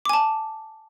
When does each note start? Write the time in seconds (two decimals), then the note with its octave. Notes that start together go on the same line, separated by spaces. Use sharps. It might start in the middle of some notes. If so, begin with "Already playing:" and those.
0.05 D6
0.09 G#5
0.13 A5